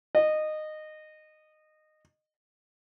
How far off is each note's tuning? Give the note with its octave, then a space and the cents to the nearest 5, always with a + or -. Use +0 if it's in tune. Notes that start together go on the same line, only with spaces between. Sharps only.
D#5 -15